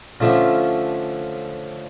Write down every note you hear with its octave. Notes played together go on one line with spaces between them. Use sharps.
D3 F3 A3 C#4 F4